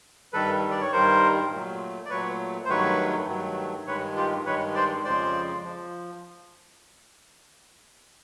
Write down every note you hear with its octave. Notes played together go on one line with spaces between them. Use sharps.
G2 D#3 G3 A4 B4
D5
C#5
G2 D#3 G3 A#4 C5
A#2 F#3 A3
D5
A#2 F#3 A3 B4 C#5
C5
G2 D#3 F#3 A3 B4 C#5
G2 D#3 F#3 A3
G2 D#3 G#3 B4 C#5
F4 G4
G2 D#3 G#3 B4 C#5
C5 D5
F2 C#3 F3 G#3 C5 D5
F3